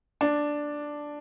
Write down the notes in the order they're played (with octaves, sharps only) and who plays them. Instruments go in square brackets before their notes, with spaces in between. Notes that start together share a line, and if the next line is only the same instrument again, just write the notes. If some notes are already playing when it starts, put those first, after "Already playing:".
[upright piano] D4